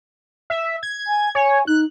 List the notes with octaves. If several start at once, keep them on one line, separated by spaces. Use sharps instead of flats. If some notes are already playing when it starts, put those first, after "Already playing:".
E5
G#6
G#5
C#5 G#5
D#4 F#6